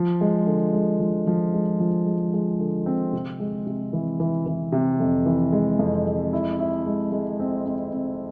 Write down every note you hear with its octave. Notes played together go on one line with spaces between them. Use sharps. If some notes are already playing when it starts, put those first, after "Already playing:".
Already playing: F3
G#3
D3
G#3
F3
F3
G#3
F3
G#3
G#3
D3
C4
C3
G#3
C3
E3
E3
E3
C3
F2
E3
G#3
F2
G#3
E4
E4
G#3
G#3
C4
C4
C4